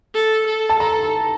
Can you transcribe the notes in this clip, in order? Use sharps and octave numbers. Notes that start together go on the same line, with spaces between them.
A4
A4
A5
A4 A#5